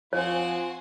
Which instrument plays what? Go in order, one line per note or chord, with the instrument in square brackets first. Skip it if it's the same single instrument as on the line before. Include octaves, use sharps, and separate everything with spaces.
[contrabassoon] F3 [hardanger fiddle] C4 F#5 [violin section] F#4 G#5 C6 [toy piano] C#5